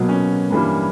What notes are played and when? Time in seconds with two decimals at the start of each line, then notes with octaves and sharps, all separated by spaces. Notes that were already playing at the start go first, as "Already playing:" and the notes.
Already playing: B2 F#3 A#3
0.09 C#4
0.50 G2 E3 G3 A#3